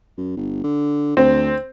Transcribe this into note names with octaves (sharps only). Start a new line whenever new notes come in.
F#2
G1
D3
D2 C4